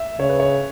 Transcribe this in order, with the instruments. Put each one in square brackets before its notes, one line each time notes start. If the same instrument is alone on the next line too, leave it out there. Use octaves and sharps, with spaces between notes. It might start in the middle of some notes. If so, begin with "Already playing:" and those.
Already playing: [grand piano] E5
[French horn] C#3 [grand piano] C#5
[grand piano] B4
C#5